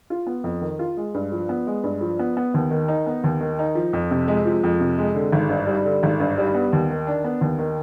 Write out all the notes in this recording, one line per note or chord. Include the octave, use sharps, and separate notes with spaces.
F4
B3
F2
D#3
F4
G#3
G2
F3
B3
G#3
G2
F3
B3
B3
D#2
D#3
D#4
B3
D#2
D#3
D#4
F3
F2
C3
G#3
F3
F2
C3
G#3
D3
G#1
G2
G3
D3
G#1
G2
G3
B3
D#2
D#3
D4
B3
D#2
D#3